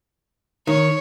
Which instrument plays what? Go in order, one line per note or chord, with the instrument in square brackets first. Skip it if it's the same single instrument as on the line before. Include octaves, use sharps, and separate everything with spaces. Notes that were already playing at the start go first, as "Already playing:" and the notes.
[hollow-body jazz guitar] D#3 [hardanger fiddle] C#5